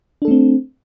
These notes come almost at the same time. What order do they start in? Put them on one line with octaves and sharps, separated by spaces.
D4 A4 A3 C4